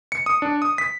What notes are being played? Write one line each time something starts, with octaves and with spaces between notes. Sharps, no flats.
C#7
D#6
D4
D#6
B6